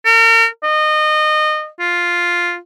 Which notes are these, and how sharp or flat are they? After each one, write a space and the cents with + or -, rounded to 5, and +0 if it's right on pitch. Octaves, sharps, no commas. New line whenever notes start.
A#4 -40
D#5 -25
F4 +0